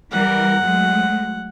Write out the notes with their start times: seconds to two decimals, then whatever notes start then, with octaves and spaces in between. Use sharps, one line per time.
0.11 E3 G3 A#4 F#5
0.60 F#3 G#3 A3